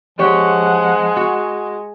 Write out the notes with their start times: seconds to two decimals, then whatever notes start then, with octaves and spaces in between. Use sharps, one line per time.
0.19 F3 G#3 G4 C#5 F#5
1.17 F#4